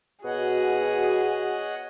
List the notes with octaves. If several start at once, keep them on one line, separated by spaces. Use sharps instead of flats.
B2 F#4 G#4 C#5 D#5 F#5